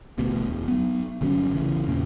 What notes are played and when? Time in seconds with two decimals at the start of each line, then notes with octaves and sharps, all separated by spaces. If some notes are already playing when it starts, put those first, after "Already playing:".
0.18 D1 A1 D2 B2
0.45 E1
0.68 F#3 B3
1.21 G1 D3 F#3 C#4
1.52 A1 C#3 E3
1.87 E2 A#2 C#3 A#3